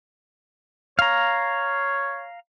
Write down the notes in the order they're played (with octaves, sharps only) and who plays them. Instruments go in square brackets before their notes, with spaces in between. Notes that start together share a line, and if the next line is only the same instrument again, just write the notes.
[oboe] C#5 [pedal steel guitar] F5 A#5